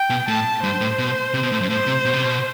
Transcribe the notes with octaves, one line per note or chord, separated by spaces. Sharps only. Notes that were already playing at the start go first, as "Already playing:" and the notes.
Already playing: G5
B2
A2 A5
G2 C5
A2
B2
C3
B2
A2
F#2
A2 C5
C3
B2
C3
B2